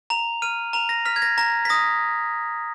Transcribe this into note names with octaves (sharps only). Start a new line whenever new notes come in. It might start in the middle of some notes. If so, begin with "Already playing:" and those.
A#5 F7
F6 D#7
A#5 F7
A#6
F6 B6
G#6
A#6
A#5 A#6
B6
D#6 A#6